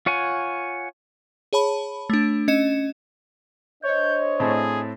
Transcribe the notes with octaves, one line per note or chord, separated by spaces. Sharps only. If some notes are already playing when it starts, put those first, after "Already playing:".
F4 C#5 F#5 G#5
G#4 C#5 A5 B5
A3 D4
C#4 D#5 C#7 E7
D4 C5 C#5 D#5 G6
A2 C4 G#4 A5